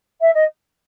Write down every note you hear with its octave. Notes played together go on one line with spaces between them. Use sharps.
E5
D#5